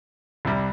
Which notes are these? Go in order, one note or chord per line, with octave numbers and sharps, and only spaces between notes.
C2 C3 G3